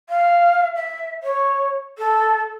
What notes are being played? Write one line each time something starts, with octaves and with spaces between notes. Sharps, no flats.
F5
E5
C#5
A4